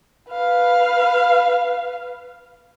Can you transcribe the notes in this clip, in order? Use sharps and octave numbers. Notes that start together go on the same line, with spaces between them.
B4 F5